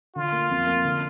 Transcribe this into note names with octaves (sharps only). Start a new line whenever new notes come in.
D3 F4
A#3
F2
A#3
D3